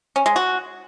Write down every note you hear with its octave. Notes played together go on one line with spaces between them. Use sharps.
C#4
G#3
F#4